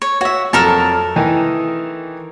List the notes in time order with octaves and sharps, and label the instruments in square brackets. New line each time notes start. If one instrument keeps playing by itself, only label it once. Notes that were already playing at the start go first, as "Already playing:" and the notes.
[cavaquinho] C#5
[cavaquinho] F#4 E5 [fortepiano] C#5
[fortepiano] F2 F#3 [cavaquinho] A4 A#4 A5
[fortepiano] D#3 E3 D#4